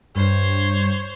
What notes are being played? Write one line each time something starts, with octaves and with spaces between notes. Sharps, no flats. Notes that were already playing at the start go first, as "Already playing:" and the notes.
G2 C5 C#5